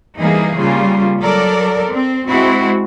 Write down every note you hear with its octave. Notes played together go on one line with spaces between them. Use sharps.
E3 G3 A#3 D#4 G#4
C#3 G3 A#3 F4
F#3 A4 A#4 D5
C4
G#3 C4 E4 F#4